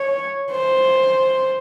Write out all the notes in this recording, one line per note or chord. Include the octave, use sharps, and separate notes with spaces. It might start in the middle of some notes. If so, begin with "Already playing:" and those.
Already playing: C#5
C5